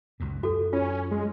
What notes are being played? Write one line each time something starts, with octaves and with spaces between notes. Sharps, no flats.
C#2 F#2 A#2
F#2 F#4 A4
C#4 F4
G#3